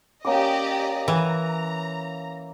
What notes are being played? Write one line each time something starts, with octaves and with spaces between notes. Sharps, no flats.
A#3 C#4 G4 D5 D#5 D6
E3 A#5